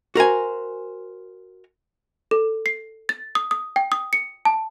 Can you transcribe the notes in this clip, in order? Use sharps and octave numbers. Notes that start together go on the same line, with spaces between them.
F#4 A#4 C5 G#5
A4
C7
A6
D#6
D#6
G5
D#6
C#7
A5